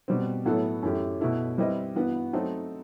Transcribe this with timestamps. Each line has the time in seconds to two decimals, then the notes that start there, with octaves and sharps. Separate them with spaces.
0.08 B2 G3 C4
0.46 A2 F#3 B3 E4 A4
0.83 F#2 E3 A3 E4 G4
1.21 B2 A3 E4 A4
1.58 G3 C4 E4 B4 D#5
1.95 G2 E3 B3 F#4 B4
2.33 F#3 A3 C4 D#4 A4